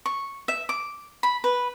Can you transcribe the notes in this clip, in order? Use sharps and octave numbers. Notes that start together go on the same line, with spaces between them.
C#6
E5
D6
B5
B4